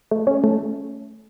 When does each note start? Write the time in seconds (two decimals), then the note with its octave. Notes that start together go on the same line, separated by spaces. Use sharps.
0.11 A3
0.27 C#4
0.44 A3